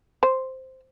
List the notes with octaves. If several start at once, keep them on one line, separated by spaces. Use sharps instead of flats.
C5